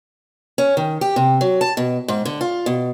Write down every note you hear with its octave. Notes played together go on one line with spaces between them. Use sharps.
C#4
D#3
G4
C3
F#3
A5
B2
G#2
D3
F4
B2